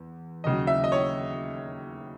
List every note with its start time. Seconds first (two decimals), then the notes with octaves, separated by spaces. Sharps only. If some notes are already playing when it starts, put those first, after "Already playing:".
Already playing: E2
0.44 D#2 C#3 F#3 D#5
0.67 E5
0.84 D#5
0.92 C#5